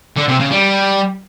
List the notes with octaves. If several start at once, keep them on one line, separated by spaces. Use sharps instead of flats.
D3
C3
C#3
G3